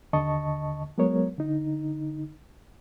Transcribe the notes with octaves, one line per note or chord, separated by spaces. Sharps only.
D#2 D3 D#5 A5 C#6
F#3 G#3 B3 A#4 C#5
D3 D#4